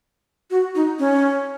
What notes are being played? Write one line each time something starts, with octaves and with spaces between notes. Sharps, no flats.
F#4
D#4
C#4